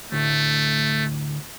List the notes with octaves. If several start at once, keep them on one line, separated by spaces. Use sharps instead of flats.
D2 A2 A3